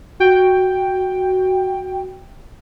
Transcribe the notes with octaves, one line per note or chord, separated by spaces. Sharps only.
F#4 G5